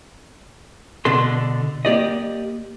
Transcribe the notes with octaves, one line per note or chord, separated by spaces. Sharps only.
B2 D3 D4 A4 C6
A#3 G4 D5 D#5